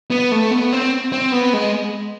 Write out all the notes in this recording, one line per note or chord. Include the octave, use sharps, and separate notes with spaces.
B3
A3
B3
C4
C4
B3
G#3